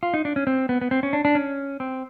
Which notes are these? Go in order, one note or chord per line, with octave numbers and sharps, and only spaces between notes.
F4
D#4
D4
C#4
C4
B3
B3
C4
C#4
D4
D4
C#4
C4